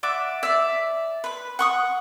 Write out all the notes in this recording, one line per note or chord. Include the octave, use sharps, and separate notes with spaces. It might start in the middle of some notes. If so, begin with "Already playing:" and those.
D5 E5 F#5 D6
D5 E5
B4 B5
F#5 C#6 D#6